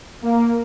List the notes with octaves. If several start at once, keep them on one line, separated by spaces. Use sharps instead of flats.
A#3